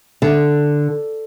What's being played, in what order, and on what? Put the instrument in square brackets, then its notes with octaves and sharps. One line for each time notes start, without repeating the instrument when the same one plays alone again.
[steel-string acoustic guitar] D3